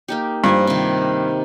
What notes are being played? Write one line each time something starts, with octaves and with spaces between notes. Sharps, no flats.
A#3 D#4 G4
G2 F3 A#3 G#5
C3 D#3